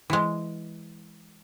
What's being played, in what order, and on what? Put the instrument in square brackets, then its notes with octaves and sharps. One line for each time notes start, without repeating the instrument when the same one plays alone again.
[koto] E3 G#3